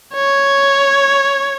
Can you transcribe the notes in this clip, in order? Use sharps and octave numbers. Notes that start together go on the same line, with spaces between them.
C#5